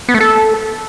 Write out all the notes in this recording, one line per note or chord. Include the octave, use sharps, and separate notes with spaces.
B3
A3
A4